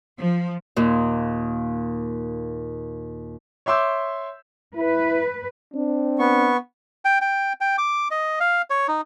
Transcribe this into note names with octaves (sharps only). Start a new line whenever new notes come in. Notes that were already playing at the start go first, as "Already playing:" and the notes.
F3
D#2 A#2
C#5 E5 C6 D6 E6 G6
E4 B4
C4 D4
B3 C#6
G5
G5
G5
D6
D#5
F5
C#5
D#4